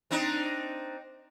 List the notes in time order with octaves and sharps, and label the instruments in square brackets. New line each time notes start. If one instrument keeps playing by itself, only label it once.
[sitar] C4 D4 D#4